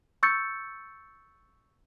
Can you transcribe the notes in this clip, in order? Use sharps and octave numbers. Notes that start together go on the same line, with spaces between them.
C#6 E6 G6 A6 C#7